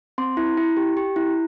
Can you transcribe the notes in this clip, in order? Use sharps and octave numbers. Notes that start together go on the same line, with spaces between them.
C4 C6
E4
E4
G4
G4
E4